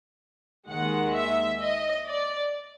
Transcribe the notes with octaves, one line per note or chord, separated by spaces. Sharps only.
D#2 D#3 G#3 F#5
E5
D#5
D5